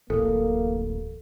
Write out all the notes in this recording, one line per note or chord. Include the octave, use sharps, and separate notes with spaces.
D1 A1 A#3 A4